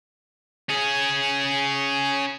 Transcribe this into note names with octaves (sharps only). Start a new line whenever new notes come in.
C#4 G#4